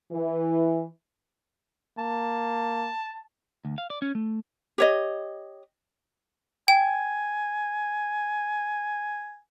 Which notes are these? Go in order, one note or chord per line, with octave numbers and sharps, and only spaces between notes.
E3
A#3 A5
D2
F5
D5
C#4
A3
G4 C#5 D#5
G5 G#5